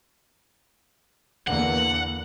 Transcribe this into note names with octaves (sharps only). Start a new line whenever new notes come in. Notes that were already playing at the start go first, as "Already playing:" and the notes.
E2 D3 A#3 F#5